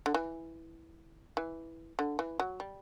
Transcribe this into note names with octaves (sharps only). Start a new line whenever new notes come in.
D3
E3
E3
D3
E3
F#3
G3